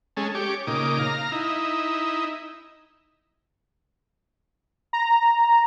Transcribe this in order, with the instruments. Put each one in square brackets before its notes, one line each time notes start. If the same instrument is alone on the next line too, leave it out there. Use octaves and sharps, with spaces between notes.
[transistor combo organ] G#3 C#4 A4
G4 C#5 D6
A#2 C#3 D#4 D6
F5 A#5
D#4 E4
[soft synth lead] A#5